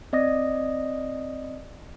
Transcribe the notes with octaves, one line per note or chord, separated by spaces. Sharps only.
C4 D5 D#5 D#6 A#6